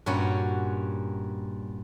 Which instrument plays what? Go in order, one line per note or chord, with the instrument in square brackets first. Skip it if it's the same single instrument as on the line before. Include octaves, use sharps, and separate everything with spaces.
[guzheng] G2 A#2 C#4 F#4 C#5